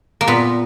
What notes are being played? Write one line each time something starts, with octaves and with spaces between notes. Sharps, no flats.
A#3
A#2 B3